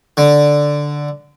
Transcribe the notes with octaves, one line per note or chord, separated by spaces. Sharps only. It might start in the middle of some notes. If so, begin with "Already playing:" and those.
D3